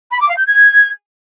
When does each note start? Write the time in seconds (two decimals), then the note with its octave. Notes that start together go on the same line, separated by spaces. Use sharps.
0.12 B5
0.21 D6
0.29 F5
0.38 G6
0.47 G#6